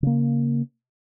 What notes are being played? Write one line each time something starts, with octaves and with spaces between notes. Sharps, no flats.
C#3 A#3